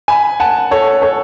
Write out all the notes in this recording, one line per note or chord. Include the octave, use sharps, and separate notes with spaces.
G#5 B5
F#5 A5
A4 C#5
A4 C#5